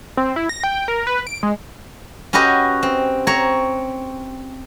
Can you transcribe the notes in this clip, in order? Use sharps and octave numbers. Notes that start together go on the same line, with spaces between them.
C4
E4
A#6
G5
A#4
B4
D7
G#3
C#4 F#4 G4 B4 D#5
C4
C4 C#5 A#5